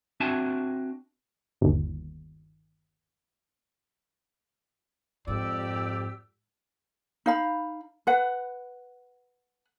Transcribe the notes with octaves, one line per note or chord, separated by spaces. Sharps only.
C4 D4 F#4 E5 G#5 A5
G1 D#2
F2 G#2 G4 D5 E6
D#4 F5 B5
B4 F#5